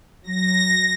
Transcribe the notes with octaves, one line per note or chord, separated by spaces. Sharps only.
F#3 A#6